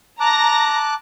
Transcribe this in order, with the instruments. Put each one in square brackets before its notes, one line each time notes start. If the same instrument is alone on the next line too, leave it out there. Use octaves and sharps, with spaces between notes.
[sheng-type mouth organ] A5 D6 F#6 [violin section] A#5 A#6